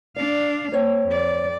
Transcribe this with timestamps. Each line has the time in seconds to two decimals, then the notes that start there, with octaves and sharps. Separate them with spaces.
0.16 D4 D5 F5
0.72 A#3 C5 C#5 G5
1.08 F2 D5